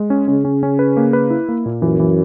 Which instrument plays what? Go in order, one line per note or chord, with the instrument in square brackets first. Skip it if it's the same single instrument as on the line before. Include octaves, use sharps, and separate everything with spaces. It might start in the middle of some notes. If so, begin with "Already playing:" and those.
Already playing: [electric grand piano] G#3
C#4
[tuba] C#3 [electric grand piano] C#4
[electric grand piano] C#4
C#4
B4
A#3
B4
E4
A#3
A#2
[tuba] F#2 [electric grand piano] E3
[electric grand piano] E3